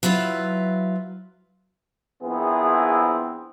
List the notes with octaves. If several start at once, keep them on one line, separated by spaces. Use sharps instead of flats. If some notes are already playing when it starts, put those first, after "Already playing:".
F#3 E4 F4 B4 E5
A#1 B3 C4 E4 G#4